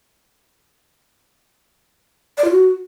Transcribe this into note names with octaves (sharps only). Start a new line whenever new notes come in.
D5
F4
F#4